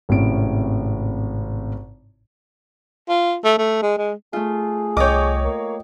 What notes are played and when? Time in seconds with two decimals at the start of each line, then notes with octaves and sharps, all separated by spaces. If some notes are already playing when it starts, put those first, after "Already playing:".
0.09 G#1 A2 C3 C#4 E4 D7
3.09 F4
3.44 A3
3.58 A3
3.82 G#3
3.98 G#3
4.33 A3 F4 G#4
4.97 C2 C#5 D#5 G5 D6
5.44 A#3